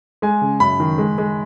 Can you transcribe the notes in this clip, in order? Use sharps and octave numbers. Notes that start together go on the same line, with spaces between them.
G#3 G#5
C#3
F#2 B5
D#3
G#3
G#3